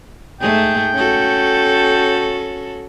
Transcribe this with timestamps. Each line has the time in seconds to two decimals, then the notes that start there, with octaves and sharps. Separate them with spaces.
0.41 G#2 A3 G#4 G5
0.93 C#4 F#4 A4